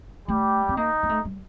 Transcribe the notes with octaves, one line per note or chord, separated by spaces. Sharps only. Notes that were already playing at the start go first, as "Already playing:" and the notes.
G3 A3 G4
C4
A#3 D#4
A#3
A3
G3